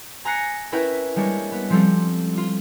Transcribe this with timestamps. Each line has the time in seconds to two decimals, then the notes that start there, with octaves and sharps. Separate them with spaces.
0.25 G#5 A#5 F#6 A#6 C7 C#7
0.72 C#4 E4 A#4 B4 E5 G5
1.16 G3 G#3 A#3 D4 C#5
1.52 B3
1.70 F3 G3 C4 F4 A4
2.37 F4